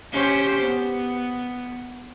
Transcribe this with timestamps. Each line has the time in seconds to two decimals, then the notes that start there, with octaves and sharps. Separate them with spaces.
0.12 C#4 G4 C5
0.62 B3